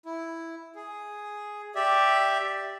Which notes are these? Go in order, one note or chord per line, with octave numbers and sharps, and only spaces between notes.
E4
G#4
G4 D5 E5